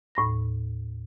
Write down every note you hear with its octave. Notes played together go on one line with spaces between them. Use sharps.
D#2 A2 B5 A#6